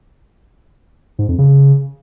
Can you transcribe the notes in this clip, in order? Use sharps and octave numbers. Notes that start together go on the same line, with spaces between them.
G#2
F2
C#3